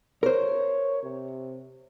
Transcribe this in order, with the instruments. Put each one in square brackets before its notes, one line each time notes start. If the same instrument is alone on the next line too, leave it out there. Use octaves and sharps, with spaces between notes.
[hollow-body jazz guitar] A#4 C5 [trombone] C#5
[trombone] C3